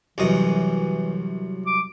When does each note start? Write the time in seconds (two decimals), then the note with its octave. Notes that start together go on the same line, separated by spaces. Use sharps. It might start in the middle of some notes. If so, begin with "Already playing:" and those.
0.18 C2 F#2 E3 D#5
1.66 D6